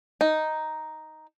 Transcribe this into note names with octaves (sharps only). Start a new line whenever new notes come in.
D#4